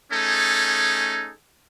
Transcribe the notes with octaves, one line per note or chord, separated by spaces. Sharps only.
A3 C#4 D#4 G#4 A4